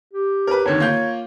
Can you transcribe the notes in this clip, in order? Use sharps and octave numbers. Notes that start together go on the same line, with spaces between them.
G4
A#4 B4
D#2 D3 D#3 C#5
A#3 F4 G6